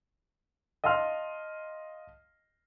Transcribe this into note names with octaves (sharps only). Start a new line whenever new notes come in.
D#5 F5 A5 C6 F6